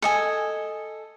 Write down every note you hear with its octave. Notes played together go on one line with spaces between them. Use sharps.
A4 D#5 G#5